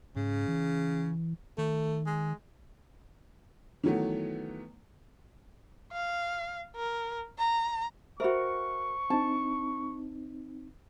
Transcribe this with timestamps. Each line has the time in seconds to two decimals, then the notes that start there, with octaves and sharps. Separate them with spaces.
0.16 G#2 C#3
0.48 E3
1.58 D#3 A3
2.06 G#3
3.84 D#3 E3 F#3 A3 B3
5.92 F5
6.76 A#4
7.38 A#5
8.20 F#4 A#4 C5 E5 B5 C#6
9.10 C4 D4 D#4 A5